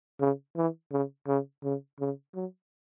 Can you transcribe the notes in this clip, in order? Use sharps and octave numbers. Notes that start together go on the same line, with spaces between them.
C#3
E3
C#3
C#3
C#3
C#3
F#3